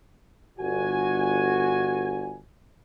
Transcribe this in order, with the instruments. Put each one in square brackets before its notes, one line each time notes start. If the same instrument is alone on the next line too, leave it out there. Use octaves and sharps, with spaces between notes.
[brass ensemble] G1 F#4 G#5